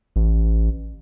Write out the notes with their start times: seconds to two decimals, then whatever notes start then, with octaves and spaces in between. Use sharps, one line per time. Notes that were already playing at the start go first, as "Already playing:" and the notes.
0.16 A1